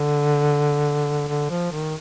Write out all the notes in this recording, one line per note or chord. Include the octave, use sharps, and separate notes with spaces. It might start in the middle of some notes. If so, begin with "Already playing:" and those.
Already playing: D3
D3
F3
D#3